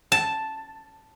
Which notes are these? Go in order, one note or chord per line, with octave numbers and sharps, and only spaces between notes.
A5